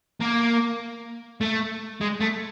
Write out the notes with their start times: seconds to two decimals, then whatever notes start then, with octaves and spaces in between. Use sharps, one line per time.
0.20 A#3
1.41 A3
2.01 G#3
2.20 A3